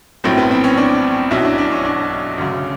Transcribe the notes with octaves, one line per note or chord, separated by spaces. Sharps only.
A#1 A2 F#3 C4
B3
C4
C#4
D4
B1 B2 F#3 E4
D4
D4
C#4
D4
D2 C#3 F#3